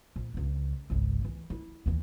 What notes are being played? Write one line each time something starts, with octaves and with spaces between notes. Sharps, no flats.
A#1
C#2 D4
G#1 C#2
E3
E4
D#2 E3